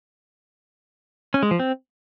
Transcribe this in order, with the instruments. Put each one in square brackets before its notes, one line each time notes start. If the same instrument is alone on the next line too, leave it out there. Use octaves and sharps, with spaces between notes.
[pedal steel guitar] C#4
G#3
F3
C4